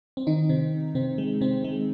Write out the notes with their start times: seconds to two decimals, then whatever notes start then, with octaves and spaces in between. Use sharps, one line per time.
0.17 C4
0.27 D#3 D#4
0.49 C3 C4
0.95 C3 C4
1.18 G#3
1.41 C3 C4
1.64 G#3